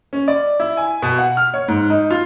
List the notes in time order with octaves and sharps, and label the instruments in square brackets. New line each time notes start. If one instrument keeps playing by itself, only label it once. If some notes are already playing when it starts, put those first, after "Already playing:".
[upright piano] C#4
D5
E4
G#5
B2
F#5
F6
C#5
G#2
D#4
F4